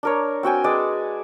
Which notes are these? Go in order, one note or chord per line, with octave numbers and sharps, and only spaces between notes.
D4 A#4 C#5
C4 F#4 G5 G#5
G#3 B4 D5